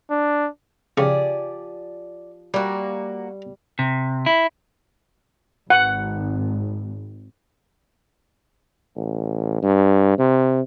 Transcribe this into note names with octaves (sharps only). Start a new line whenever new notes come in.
D4
C#3 F3 G4 G#4 D5 C#6
G3 A#3 F#4
C3
E4
G#1 F#5
A1
G2
C3